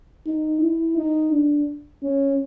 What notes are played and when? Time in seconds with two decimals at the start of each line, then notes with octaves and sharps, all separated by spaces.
0.27 D#4
0.62 E4
0.97 D#4
1.32 D4
2.03 C#4